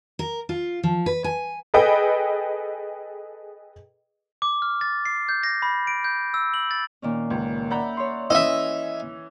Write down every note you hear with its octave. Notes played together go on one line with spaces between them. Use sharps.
A#4
F4
F3
B4
G#5
G#4 A4 B4 D#5 G5
D6
F6
A6
C7
G6
A#6
B5
D7
G6
E6
F#7
A6
A#2 D#3 C#4
C#2
D5 E5 F#5 A#5 B5 G6
C#5 C6
E3 C#4 D#5 E5 E6